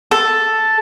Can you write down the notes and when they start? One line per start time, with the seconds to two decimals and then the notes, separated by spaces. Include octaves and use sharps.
0.11 A4